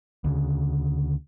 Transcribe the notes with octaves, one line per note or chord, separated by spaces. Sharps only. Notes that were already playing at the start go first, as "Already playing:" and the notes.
D2 C#3